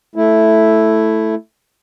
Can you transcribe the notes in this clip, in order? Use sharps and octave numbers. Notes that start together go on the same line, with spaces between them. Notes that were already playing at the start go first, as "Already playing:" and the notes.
A3 E4